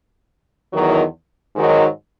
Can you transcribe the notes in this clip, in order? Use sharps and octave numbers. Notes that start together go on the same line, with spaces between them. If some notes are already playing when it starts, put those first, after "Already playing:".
E2 D#3 F#3
G#2 D#3 F#3